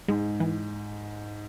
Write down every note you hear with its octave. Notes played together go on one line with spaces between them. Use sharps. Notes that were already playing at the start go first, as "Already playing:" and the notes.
G#2 G#3
E3